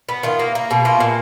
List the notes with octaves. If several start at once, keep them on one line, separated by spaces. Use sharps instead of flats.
B3
D#3 F4
A#3
A#3
B2
A#3 F4
A#2